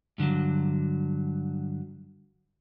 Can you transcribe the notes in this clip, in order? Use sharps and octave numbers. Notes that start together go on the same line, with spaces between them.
G2 D3 E3 F#3